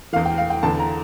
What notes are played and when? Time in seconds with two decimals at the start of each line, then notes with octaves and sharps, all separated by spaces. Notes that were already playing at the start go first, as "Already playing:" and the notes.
0.13 E2 E3 F5
0.25 G5
0.38 F5
0.50 G5
0.63 E2 D3 A5
0.79 A#5